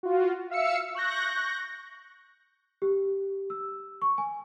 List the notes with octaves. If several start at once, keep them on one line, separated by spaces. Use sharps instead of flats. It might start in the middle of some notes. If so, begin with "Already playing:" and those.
F4 F#4
E5 F5 E6 C#7
C#6 F#6 G6 A#6
G4
E6
C#6
G#5